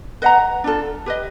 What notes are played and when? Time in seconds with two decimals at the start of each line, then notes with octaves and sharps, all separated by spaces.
0.22 B4 D#5 F#5 A#5
0.64 D4 F4 A4
1.06 G4 B4 D#5